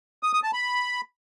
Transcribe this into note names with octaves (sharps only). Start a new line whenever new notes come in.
D#6
D#6
A5
B5